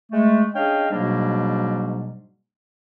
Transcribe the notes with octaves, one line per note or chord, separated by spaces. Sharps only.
G#3 A3
C#4 D4 G#4 D#5 F5 G5
G#2 B2 F#3 G3 A#3 D4